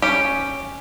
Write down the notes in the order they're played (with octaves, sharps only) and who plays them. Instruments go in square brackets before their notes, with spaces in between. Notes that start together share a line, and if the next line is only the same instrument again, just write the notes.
[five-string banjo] C#4 G4